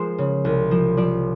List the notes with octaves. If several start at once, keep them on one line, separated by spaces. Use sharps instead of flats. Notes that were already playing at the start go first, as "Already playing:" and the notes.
Already playing: F3 G#3 G#4 A#4 C5
C#3
C2
F3
F3 D5